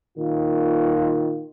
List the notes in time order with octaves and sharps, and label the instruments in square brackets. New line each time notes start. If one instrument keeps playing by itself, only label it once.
[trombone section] A#2 D#3 F4